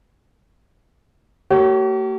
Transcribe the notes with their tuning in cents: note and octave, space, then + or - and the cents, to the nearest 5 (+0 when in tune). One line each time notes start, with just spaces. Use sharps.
A#3 -45 G4 -45 C#5 +0